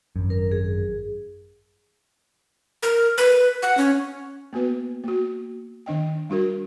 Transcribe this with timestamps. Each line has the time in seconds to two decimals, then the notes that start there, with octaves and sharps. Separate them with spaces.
0.16 G#1 F#2
0.30 A#4
0.52 G#4
2.83 A#4
3.18 B4
3.62 F#5
3.78 C#4
4.53 A#3 B3 F#4 B4
5.04 A#3 F#4
5.86 D#3 D4 D#5 G5
6.30 G3 D4 F#4 A#4